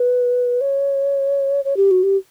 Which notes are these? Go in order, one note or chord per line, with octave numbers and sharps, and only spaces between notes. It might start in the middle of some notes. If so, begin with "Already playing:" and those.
Already playing: B4
C#5
C#5
G4
F#4
G4